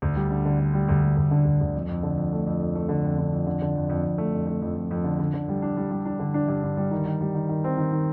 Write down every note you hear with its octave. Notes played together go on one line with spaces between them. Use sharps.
D2
G3
D3
D3
D3
G3
D2
G3
D2
D3
D2
D2
F2
F2
D3
F2
A3
F2
F2
A3
D3
F2
D3
F2
D3
D3
F2
F2
F2
A3
F2
A3
F2
F2
F2
D3
D3
D3
G3
D4
G3
G3
D4
D3
D4
G2
D3
G3
D#3
D#3
G3
D#3
D#3
C4
D#3
D#3